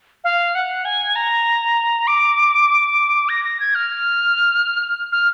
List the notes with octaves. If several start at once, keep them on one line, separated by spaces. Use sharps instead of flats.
F5
F#5
G#5
A#5
D6
A#6
A#6
G#6
F6
F6